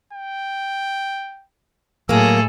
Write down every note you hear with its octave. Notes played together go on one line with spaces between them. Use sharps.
G5
A2 F#3 A#3 G#4 A4 E6